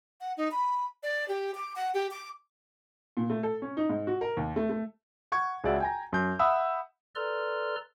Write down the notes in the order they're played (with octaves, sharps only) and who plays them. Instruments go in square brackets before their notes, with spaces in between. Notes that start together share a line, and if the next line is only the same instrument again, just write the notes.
[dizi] F#5
D#4
B5
D5
G4
D6
F#5
G4
D6
[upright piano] A#2
A3
A4
C#4
D#4
G#2
F#4
A#4
D#2
A3
A3
[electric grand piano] F#5 C#6 G#6
C#2 C#3 F#4 D5 E5 F#5
G5 G#5 A#5
F#2 G6
E5 F#5 B5 D#6 E6
[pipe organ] A4 B4 D5 A#5 C6 F6